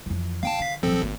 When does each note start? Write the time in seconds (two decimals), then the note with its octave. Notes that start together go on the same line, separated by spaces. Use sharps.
0.06 F2 E3
0.43 D3 F5 G5 A5
0.59 D3 F5 B6
0.83 A#1 F3 F#3 C4 A4
1.02 G#1 A#3